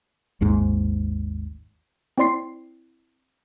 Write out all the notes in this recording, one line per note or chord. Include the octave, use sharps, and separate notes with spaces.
G#1 D#2 G#2
C4 E4 D5 C6 C7